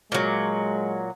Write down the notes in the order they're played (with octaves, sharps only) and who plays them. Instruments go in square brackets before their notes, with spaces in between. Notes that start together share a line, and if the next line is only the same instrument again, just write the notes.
[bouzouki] A#2 F#3 [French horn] G#3